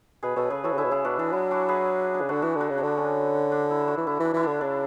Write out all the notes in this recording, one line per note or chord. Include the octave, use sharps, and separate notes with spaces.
B2 G#4 B4
B2 A4 C#5
C#3 G#4 B4
E3 F#4 A4
C#3
D3 E4 G#4
B2
C#3 E4 G#4
B2 D4 F#4
E3 D4
F#3 E4
D4 F#4
G#4 B4
D4
C#3
D3 D4 F#4
E3 D4 F#4
D3
D4 F#4
C#3
D3 D4
C#4
D4
E4
D4 F#4
E3
D3 E4
E3
D4
E3 E4
D3 D4
C#3 D4